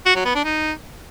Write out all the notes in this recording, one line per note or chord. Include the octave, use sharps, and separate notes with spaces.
F#4
F#3
B3
D4
D#4